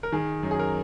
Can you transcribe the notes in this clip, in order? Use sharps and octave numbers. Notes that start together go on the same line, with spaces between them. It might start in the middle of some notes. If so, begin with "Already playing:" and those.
A#4
D#3 G#4
F#2
G#4
A#4